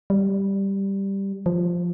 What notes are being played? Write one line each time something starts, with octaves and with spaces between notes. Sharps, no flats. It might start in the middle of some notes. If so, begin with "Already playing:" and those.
G3
F3